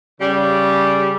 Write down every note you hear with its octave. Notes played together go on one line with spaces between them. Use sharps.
C#3 G3